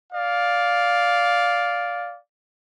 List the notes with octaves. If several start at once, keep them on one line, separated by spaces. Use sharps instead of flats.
D5 F5